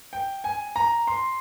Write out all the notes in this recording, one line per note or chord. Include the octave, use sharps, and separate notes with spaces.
G5
G#5
A#5
C6